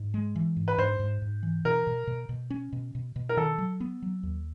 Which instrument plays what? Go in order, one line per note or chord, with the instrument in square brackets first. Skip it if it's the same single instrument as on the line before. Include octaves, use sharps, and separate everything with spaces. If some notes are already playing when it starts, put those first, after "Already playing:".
Already playing: [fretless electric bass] G#2
G#3
E3
G#2
[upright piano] B4
[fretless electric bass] G#2 [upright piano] C5
[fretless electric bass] G#2
G#2
E3
[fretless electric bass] B2 [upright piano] A#4
[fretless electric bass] B2
B2
B2
C#4
B2
B2
B2
[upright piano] A#4
[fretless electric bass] D#3 [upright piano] A4
[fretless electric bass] F#3
B3
F#3
D#2